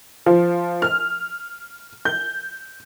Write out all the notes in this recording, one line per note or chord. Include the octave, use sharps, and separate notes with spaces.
F3
F6
G6